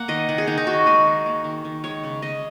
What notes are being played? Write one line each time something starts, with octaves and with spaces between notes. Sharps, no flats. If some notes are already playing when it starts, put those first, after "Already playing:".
Already playing: A#3 F#5
D#3 D#5
D#3 F#5
G#4
D#3 D#4
D#4
D#3 F#4
G#3 G#4
D#3
A#3
D#3
D#3
G#3 C#5
C#3
C#3 D#5